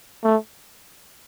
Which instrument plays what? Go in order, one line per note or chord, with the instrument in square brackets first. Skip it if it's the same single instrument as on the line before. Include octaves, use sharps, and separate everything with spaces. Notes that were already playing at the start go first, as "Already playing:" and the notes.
[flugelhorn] A3